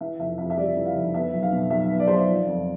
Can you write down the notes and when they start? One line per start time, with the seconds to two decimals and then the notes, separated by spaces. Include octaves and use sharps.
0.01 E3 E5
0.19 F1 E5
0.38 F2 E5
0.50 E5
0.57 G3 D5
0.76 E3
0.86 F5
0.96 F1
1.14 B3 E5
1.33 B1
1.43 F5
1.52 B2
1.70 B1 E5
1.90 B3
1.99 D5
2.08 B1 C5
2.16 D5
2.27 F3
2.47 F2